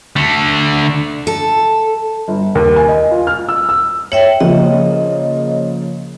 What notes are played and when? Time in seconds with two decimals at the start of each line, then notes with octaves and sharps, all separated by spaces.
0.16 D3 A3
1.27 A4
2.28 G1
2.55 D#2
2.76 G#5
2.88 D#5
3.11 F4
3.27 F6
3.49 E6
3.69 E6
4.12 C#5 E5 G5 F#7
4.40 C#3 F3 A#3 D#5